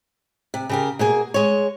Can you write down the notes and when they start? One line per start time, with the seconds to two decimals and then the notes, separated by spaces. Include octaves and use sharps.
0.54 C3
0.69 C#3 G4 A#4
0.99 B2 A#3 G#4
1.34 G#3 C#5